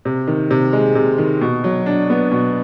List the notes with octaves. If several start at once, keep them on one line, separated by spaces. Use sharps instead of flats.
C3
D#3
C3
G#3
C3
D#3
B2
F#3
D4
B3
B2